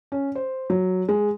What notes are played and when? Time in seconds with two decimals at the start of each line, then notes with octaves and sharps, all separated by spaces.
0.12 C#4
0.35 C5
0.70 F#3
1.09 G#3